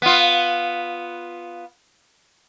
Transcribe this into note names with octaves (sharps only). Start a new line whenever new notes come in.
B3 F4